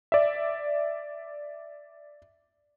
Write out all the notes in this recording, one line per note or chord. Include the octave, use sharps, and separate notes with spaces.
D5 E5